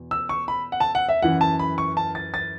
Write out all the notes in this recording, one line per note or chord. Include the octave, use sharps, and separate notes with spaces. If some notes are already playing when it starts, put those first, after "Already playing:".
Already playing: E2 B2
E6
C#6
B5
F#5
A5
F#5
E5
F#2 E3 F#5
A5
B5
C#6
A5
A6
A6